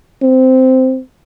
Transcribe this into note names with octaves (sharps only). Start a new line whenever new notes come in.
C4